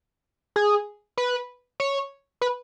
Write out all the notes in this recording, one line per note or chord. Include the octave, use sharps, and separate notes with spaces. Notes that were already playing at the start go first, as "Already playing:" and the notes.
G#4
B4
C#5
B4